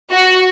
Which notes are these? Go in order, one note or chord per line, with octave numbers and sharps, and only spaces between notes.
F#4